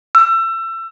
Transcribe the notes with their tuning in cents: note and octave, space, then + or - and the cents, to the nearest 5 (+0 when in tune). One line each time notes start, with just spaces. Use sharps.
E6 +30